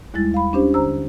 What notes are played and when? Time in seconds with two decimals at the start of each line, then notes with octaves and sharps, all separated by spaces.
0.14 D#2 G3 G#3 E4 A6
0.34 F5 B5
0.53 C#4 D4 G4 C5
0.74 D3 C5 A#5 E6